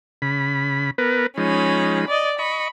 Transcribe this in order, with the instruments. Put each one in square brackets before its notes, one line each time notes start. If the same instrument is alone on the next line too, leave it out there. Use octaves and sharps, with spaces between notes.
[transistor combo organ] C#3 B5
B3 A#4 B4
[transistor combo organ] F3 G#3 D#4 [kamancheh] C#4 B5
[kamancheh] D5 D#5
[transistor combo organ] D#5 C#6 [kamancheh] B5